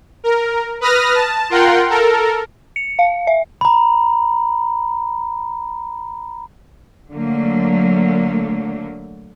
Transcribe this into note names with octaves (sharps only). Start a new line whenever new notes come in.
A#4
B4 D#6 F6 A#6
A5
F4 A#4 F#5 G5 C6
A4 A#4
C#7
F5
E5
A#5 B5
D3 F#3 A3 A#3